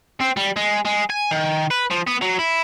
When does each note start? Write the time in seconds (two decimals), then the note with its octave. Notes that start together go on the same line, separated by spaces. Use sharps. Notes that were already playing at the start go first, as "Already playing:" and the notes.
0.21 C4
0.37 G3
0.56 G#3
0.85 G#3
1.10 G#5
1.31 D#3
1.71 B4
1.91 F3
2.07 B3
2.22 F#3
2.39 E4